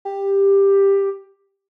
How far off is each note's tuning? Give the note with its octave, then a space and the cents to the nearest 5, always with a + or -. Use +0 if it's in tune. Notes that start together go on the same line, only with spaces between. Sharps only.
G4 +10